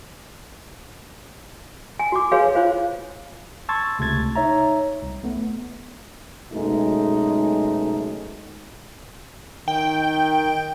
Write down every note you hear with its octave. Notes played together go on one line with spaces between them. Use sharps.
G#5
F#4 D6
F#4 G#4 B4 C#5 F5 G#5
F4 C5 F5
A5 C6 C#6 E6 G#6 A6
C#2 C3 A3 G#6 A6
D#4 C#5 E5 A#5
C2
A3 B3
F#2 B2 G#3 A3 D#4
D#3 G5